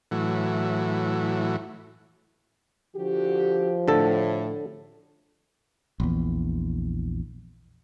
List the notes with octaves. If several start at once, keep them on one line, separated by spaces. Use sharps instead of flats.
A2 E3 F#3
D3 F3 F#4 G4
A2 D3 A4
A#1 E2